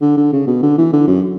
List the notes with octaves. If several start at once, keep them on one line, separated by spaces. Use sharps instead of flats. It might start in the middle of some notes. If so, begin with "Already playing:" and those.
D3
D3
C#3
B2
D3
E3
D3
F#2